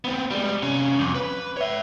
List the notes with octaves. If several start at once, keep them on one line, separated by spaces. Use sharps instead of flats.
B3 C4
G3 G#3
C3 C#4
C2 F2
B4
C#5 E5